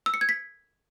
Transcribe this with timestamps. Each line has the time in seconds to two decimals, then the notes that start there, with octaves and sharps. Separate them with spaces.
0.06 E6
0.14 C#7
0.21 G#6
0.29 B6